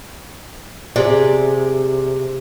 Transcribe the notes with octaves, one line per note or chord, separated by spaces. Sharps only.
C3 G4 G#4 D5